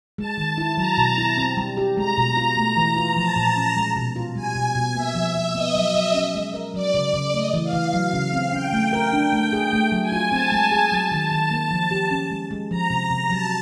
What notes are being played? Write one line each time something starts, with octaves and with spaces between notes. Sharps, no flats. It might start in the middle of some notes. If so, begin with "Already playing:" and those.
G#3 A5
D#3
E4
F#3 A#5
B2
E4
C4
G3
G4
G#3 A#5
B2
F4
A3 A#5
E3
F4
F3 A5
A#2
C#4
G#3
B2
F4
G3 G#5
B2
B2
A#3 E5
F3
F3
B3 D#5
F#3
F#3
C#4
G#3
A#4
F#3 D5
C#3
C#3
A3 D#5
E3
F5
E3
F#3
C#3
C4
C#4 G5
A3
A#4
D4
A3
G#4
A3 G5
F#3
G#5
F4
C4 A5
G#3
G#4
F#3
D#3
D#3
A#3
F3
G4
C#4
G#3
G#3
F3 A#5
C3
C3
F#3 A5